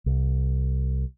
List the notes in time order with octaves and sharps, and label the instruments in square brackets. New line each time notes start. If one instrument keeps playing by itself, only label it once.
[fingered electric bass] C2